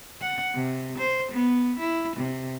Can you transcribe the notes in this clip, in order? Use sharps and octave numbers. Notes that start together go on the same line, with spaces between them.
F#5
C3
C5
B3
E4
C3